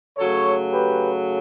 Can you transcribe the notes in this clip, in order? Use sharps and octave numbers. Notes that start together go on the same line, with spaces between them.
C#3 F#3 A3 A4 C#5
G4 B4